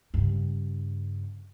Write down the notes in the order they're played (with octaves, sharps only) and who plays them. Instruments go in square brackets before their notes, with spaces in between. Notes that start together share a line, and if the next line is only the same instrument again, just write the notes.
[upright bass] G2 C#3